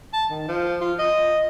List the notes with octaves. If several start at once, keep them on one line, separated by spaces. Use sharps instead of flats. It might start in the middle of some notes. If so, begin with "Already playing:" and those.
A5
D#3
F3
F4
D#5